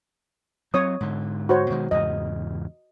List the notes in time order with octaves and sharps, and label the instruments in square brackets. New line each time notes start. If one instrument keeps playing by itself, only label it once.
[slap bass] F#3 C4 [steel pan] C#5 D#6
[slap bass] G#2 D3
[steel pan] F#4 C5 C#5
[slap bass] B2 D#3 G#3
[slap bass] E2 G#2 C#3 [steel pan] D#5